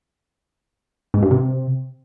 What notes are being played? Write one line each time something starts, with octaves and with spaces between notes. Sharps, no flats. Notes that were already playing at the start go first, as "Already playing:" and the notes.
G#2
G2
C3